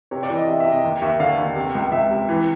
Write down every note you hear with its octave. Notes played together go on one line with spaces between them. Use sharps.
C3 C#5
D5
E3
D#5
C3 E5
E5
C3
D#5
D#2
D#2 E5
D3 F5
D#2
C3
C#2
C#2 E5
C3
E3